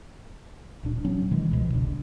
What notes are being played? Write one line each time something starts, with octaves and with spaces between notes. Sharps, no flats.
D1 A#2 D4
F#3 B3 C#4
B2 D#3 E3 G#3
C#2 B2 F3
F1 C2 D3